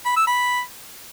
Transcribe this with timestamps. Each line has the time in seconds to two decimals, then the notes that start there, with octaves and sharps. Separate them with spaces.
0.05 B5
0.16 E6
0.27 B5